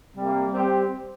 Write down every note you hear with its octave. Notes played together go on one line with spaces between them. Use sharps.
C3 G3 A#3
G3 C4 G4 C5